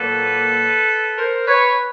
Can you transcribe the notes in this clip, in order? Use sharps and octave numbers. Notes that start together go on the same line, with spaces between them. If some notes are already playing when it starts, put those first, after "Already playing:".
Already playing: A#2 F#3 A#3 A4 B4
A#4 C5
B4 C#5